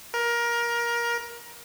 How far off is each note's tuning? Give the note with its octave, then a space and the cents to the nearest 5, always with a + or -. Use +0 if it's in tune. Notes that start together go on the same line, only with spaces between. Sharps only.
A#4 +20